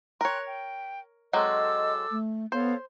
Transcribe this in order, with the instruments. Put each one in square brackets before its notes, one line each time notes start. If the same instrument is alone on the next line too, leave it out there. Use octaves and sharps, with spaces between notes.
[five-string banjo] A#4 C#5 [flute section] G5 C6 F#6
[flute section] G5
[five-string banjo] F#3 G#3 C4 [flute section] A4 D6 E6 [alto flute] D#5
[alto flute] A3
[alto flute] B3 [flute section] A4 C#5 F5 [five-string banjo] C5